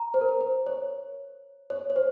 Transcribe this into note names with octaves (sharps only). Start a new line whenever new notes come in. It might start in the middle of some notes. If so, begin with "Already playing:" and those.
Already playing: A#5
C5
A#4
C5
C5
C#5
C#5
C#5
C5